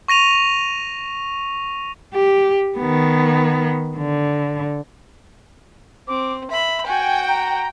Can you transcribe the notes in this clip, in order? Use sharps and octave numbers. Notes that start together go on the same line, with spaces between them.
C#6 A#6 D#7 F7
G4
D#3 B3
D3
C4 D6
E5 B5
F#4 G5 G#5
A#5